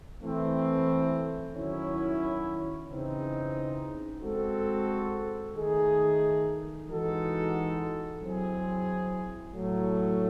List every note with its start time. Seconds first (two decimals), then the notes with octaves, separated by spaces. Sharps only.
0.22 E3 A3 C4
1.55 D#3 F#3 C#4 E4
2.88 C#3 E3 C4 D#4
4.21 G#3 C4 F#4 A4
5.54 D#3 A3 D#4 G#4
6.88 E3 G#3 D#4 F#4 A4
8.21 F#3 C4 E4 G#4
9.54 A2 F#3 A3